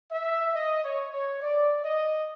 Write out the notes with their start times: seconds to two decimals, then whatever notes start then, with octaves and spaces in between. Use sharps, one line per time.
0.11 E5
0.54 D#5
0.83 C#5
1.12 C#5
1.40 D5
1.84 D#5